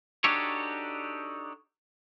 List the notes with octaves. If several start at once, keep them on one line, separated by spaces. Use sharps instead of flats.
D4 D#4 F#4 G4 A4 C#5